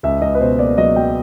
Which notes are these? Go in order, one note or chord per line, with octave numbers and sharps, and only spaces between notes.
C#2 E5
C#2 D#5
B4
B2 C5
A#3 D5
F#3 D#5
F#3 G5